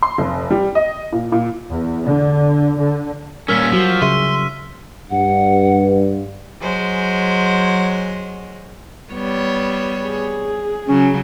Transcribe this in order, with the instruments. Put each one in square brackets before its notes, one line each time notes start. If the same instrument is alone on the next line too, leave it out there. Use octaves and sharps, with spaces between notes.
[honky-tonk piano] C6
F1
G3
D#5
A#2
A#2
[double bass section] E2
D3
D3
[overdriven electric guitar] A#2 C#4 [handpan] G3 A#4 [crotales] E6 F6 B6
[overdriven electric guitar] F3 [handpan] F#3 F#4
[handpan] C#3 G#4 E5 [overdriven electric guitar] C6 [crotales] D#7
[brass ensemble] G2 [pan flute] F#5
[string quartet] F#3 G#3 C5
[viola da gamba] G3 B3 C#5
[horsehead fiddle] G#4
[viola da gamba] C#3 F#3 [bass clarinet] C#4